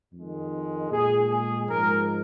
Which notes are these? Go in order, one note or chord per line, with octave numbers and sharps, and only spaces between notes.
F2 D#3 G#3
A#2 G#3 G#4
G#4
G#2 F3 G#3 A#4